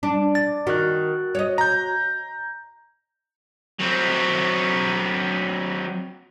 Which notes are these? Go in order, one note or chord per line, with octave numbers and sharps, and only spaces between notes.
D4
A6
D#3 F#4 F#6
C#5 D#5
A#5 G6
F#3 C4